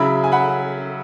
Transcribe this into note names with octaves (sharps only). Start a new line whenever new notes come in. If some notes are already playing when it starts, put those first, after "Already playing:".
Already playing: C#3 F#3 E4 B5 E6
G#5
F#5 B5